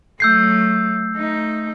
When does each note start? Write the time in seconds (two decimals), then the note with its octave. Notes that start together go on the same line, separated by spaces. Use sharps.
0.20 F#3 A3 E6 G6 C7
1.15 A3 D#4